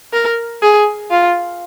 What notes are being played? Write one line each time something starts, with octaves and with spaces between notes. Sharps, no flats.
A#4
G#4
F4